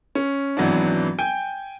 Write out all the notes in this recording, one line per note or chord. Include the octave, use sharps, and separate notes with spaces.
C#4
G#1 E3 F#3 B3 D4
G5 G#5 G6